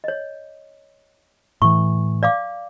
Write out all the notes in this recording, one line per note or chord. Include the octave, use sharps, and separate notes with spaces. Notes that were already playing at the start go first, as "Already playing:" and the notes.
C#5 D#5
A2 E3 C#6
D5 F5 D6